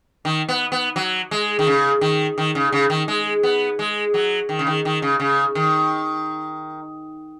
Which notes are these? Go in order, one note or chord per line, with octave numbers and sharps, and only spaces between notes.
D#3
B3
B3
F#3
G#3
D#3
C#3
D#3
D#3
C#3
C#3
D#3
G#3
B3
G#3
F#3
D#3
C#3
D#3
D#3
C#3
C#3
D#3